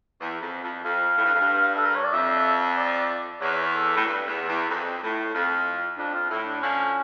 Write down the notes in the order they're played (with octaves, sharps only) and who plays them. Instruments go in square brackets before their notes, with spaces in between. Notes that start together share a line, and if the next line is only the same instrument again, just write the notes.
[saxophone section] E2
F2
F2
[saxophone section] F2 [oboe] F5
[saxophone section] A2
G2
F2
G2
[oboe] A4
A#4
C#5
D5
[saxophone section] F2 [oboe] E5
[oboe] D5
[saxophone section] E2 [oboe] C#5
[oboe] A4
[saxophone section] A2
G2
E2
E2
F2
A2
[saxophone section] F2 [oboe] F4
[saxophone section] F2 [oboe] D4
[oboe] F4
[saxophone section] A2 [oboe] E4
[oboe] D4
[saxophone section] D3 F3 [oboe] C#4